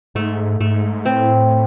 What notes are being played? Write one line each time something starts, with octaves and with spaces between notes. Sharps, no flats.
G#2 A3
G#2 A3
A2 C4